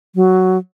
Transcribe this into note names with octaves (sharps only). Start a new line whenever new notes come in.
F#3